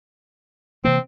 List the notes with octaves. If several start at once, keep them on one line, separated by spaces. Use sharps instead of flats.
C3 E3 A#3 C4